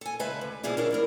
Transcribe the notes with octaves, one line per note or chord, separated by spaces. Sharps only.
A4 G#5
C#3 G#3 B4 E5 G#5 A5
D2
F2 B2 F3 E4 G#4 D5
D4 A#4 C#5 D5
D2 E4 A#4